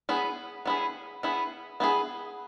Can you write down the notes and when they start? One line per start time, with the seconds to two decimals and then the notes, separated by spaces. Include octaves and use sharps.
0.09 B3 E4 G#4
0.66 B3 E4 G#4
1.23 B3 E4 G#4
1.80 B3 E4 G#4